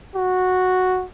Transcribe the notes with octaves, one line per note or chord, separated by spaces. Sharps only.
F#4